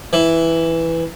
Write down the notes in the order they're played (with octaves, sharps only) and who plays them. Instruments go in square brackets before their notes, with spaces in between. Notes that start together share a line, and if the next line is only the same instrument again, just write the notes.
[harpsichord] E3